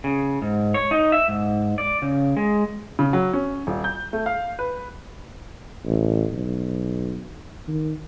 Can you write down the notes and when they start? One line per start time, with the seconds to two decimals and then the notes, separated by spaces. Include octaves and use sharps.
0.04 C#3
0.42 G#2
0.74 C#5
0.91 D#4
1.12 E5
1.28 G#2
1.78 D5
2.02 C#3
2.37 G#3
2.99 C#3
3.13 F#3
3.33 C#4
3.67 D#1
3.84 G6
4.13 A3
4.26 F5
4.59 B4
5.85 A1
6.32 B1
7.68 D#3